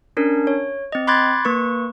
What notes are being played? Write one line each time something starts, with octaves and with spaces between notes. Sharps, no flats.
C#4 D4 A#4
C#5
C4 D#5
B5 C6 D6 F#6 G#6 A6
A#3 B4 C#6